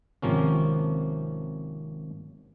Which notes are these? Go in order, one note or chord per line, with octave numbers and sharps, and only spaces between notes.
G#1 C3 F3 A#3 C#4